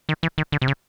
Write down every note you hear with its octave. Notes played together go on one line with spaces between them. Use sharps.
D#3
E3
D#3
D3
C3
C#3